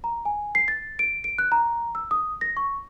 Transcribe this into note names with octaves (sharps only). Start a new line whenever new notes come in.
A#5
G#5
C7
A6
D7
D7
F#6
A#5
E6
D#6
A#6
C#6